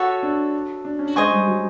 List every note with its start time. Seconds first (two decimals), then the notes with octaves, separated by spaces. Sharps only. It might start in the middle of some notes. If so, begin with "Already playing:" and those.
Already playing: F#4 A4 C#5 E5
0.23 D4
0.85 D4
0.99 C#4
1.05 D4
1.16 G#3 C5 D#5 G#5 C#6
1.31 G3
1.48 F#3